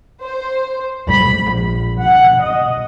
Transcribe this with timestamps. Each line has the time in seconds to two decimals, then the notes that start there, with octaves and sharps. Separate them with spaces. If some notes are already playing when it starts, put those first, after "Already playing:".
0.22 C5
1.09 B5
1.51 A#1
1.99 F#5
2.42 D#5